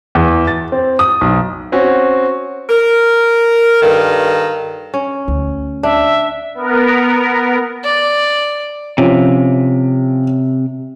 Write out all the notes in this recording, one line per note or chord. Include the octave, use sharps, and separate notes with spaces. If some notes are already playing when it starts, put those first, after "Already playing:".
E2
A6
C4
D#6
B1
C4 C#4 F#4
A#4
G2 D#3 A4 F5
C#4
D2
D4 E5
B3 A#4
D5
C3 F3 C#4